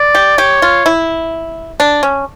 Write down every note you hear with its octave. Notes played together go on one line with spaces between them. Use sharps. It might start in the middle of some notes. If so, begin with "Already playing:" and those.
Already playing: D5
G4
G4 C#5
F4
E4
D4
C#4